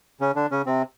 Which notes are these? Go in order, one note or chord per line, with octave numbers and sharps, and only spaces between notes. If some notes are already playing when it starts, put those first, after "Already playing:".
C#3 C#4
D3 D4
C#3 C#4
C3 C4